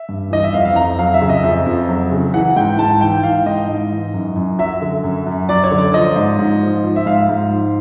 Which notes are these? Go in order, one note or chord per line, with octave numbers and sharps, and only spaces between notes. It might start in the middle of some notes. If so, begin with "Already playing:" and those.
Already playing: E5
G2
E3 D#5
E5
F2 F5
F5
F2 A#5
F#3 F5
E5
C#3
D#5
F2 E5
F2
F#3
C#3
E3 F#5
G#2 G5
G#2 A5
E3 G5
E3 F5
G#2 D#5
G#2
E3
F#2
F#2
F#3 E5
D3
F#2
F#2
F#3 D5
C#5
D3
D5
F3 D#5
G#2
G#2
F3
F3
E5
G#2 F5
G#2
F3